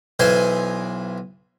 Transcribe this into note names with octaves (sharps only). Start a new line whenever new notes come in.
B1 E3 C5 G#5